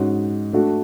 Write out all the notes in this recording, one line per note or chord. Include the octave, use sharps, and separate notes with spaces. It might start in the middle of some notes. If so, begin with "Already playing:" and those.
Already playing: G#2 G#3 C#4 F#4
A3 D4 F#4